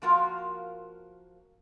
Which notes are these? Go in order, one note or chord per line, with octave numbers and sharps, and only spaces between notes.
F3 A#3 F4 F#4 A#4 F5